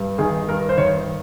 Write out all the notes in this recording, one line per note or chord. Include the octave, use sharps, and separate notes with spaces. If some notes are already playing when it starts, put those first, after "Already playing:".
Already playing: G2
D#3 G#4
G2 A#4
C5
D#3 C#5